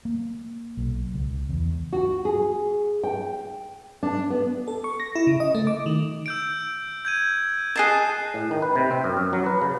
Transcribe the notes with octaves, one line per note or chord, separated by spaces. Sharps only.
A#3
B1
C#2
E2
F#4
G#4
G5
D4
B3
A4
C#6
A#6
E4
C#3
D#5
A3
D6
D#3
E6 G6 D7
G6 G#6 D#7
G#4 D#5 A5 F#6 C7 E7
A2
D#3
B4
C3
C4
F#2
F#2
F#3
B4
C#3